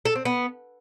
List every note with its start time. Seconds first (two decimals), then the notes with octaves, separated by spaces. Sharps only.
0.05 A4
0.15 C4
0.25 B3